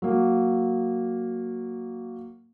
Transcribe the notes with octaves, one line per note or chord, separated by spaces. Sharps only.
F#3 A#3